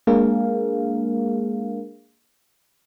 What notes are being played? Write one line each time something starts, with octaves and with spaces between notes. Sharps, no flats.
G#3 A#3 D4 G#4 A#4 F5